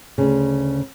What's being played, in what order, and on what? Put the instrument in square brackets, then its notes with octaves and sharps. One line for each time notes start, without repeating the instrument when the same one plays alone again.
[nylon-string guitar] D2 C#3